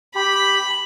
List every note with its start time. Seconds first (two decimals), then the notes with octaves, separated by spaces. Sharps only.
0.15 G4 B5